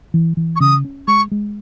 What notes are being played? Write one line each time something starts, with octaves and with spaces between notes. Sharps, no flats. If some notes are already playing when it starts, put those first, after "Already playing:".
E3
E3
C#6
C#3 D#6
C#4
G#3 C#6
G#3